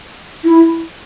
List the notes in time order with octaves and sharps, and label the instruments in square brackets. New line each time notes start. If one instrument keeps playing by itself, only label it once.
[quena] E4